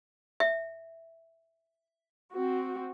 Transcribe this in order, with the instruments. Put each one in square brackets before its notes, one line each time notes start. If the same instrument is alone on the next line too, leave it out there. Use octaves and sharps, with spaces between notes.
[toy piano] E5
[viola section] C4 F#4